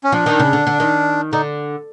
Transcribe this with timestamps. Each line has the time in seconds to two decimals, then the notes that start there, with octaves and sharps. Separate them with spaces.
0.04 C#4
0.12 F3 D4
0.26 D#3
0.40 C#3
0.53 D3
0.67 D3
0.80 D#3
1.33 D3 D#4